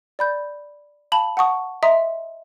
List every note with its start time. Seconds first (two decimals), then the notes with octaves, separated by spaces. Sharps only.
0.19 D5 B5 G6
1.12 F5 A5 B5 F#7
1.37 F#5 A5 C#6 D#6
1.83 D#5 E5 A#5 C6 D#6